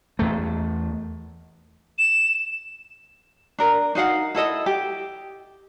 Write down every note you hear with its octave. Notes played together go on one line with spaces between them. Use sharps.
E2 A3
E7
D4 A#4
D#4 F#4 F5 F#5
E4 A4 D#5 E5
G4